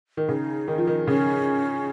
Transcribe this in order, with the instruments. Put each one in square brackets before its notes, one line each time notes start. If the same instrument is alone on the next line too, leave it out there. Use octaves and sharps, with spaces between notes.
[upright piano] D#3
[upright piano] C#3 [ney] D#4
[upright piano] D#3
F3
D#3
[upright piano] C#3 [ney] C#4